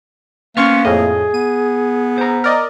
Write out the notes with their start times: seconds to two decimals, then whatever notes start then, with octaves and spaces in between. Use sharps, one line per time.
0.57 A#3 B3 C#4 C6 C#6 F6
0.85 F2 A2 G#4 D#5
1.34 B3 D#7
2.18 C5 A#5
2.44 A#4 D5 D#5